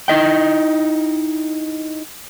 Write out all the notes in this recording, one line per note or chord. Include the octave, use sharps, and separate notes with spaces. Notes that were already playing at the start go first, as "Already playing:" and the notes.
D#4 E4 D#5 G5